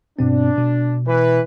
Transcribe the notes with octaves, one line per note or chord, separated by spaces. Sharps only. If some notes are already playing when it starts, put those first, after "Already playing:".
G2 B2 C4 D4
B2
E3 B4